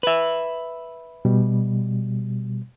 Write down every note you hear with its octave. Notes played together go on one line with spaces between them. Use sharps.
B4 E5
B2 G3